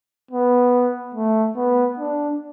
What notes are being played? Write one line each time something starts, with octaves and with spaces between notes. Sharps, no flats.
B3
A3
B3
D4